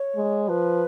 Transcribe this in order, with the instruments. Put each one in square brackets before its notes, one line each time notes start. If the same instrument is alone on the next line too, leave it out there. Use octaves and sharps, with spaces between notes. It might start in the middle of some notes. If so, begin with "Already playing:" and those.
Already playing: [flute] C#5
[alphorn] G#3
[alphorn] F3 [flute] B4